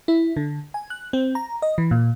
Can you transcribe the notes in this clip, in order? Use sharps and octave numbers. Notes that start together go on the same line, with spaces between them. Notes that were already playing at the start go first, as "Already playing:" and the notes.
E4
D3
G#5
F#6
C4
A#5
D#5
E3
A#2